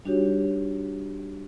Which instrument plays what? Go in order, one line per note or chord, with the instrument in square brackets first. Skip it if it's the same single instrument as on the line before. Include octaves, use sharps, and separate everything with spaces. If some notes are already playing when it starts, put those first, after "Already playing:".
[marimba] G3 D4 D#4 F#4 G4 C#5